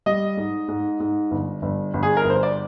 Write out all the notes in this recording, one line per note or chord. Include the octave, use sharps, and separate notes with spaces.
G3 D#5
G#2
G#2
G#2
G1
G1
G1
G#4
A#4
G1
C5
D5